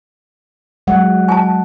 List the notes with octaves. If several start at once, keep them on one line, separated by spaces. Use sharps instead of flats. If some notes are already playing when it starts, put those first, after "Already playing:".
F#3 G#3 F#5
G#5 A5